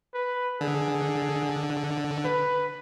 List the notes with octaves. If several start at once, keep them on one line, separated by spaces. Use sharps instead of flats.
B4
D3 G#4
B4